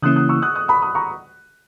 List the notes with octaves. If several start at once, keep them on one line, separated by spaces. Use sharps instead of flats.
C#3 E3 A#3 C#4 E4 D#6 F#6
D#6 F#6
C#6 E6
D#6 F#6
D#6 F#6
B5 D#6
B5 D#6
A#5 C#6